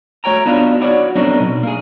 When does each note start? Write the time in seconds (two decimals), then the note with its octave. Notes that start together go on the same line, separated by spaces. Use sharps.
0.24 A3 F#4 C#5 G5 A#5
0.46 B3 D4 D#4 F4 F#4 B4
0.81 E4 F#4 C#5 D5 F#5
1.15 F#3 A3 B3 C4 D4 D#4
1.40 B2
1.63 A#3 G#4